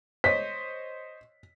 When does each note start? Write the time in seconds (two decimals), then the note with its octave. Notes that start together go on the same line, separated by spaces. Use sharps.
0.24 C5 C#5 D#5 B6